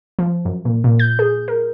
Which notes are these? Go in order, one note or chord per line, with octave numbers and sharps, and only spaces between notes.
F3
F#2
A#2
A#2
G6
G#4
A#4